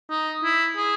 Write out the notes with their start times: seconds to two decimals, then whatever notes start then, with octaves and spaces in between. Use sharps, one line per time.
0.10 D#4
0.43 E4
0.77 G#4